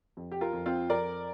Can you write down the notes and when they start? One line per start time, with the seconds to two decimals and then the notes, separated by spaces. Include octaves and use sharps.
0.17 F2
0.32 G4
0.41 F4 A#4
0.53 F2
0.66 C4 F4
0.89 F2 A#4 D5